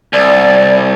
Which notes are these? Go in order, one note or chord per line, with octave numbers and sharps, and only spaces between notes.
C2 D5